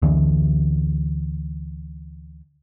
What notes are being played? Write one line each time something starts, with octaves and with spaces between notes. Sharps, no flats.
D2 D3 E3